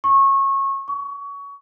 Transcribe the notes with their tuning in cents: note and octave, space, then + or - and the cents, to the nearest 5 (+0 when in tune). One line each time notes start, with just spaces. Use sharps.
C#6 -25
C#6 +25